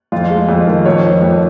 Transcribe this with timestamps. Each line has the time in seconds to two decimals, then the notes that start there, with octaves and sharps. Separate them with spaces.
0.12 F2 F4
0.30 G#3
0.49 F2
0.67 D#3
0.85 F2 C#5
1.05 F3
1.22 F2